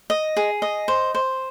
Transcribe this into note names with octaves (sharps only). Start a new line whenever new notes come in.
D#5
G#4
D#5
C5
C5